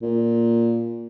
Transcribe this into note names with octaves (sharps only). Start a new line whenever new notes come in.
A#2